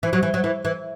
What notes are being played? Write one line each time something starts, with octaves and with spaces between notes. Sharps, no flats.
E3
F#3
E3
F#3
E3
E3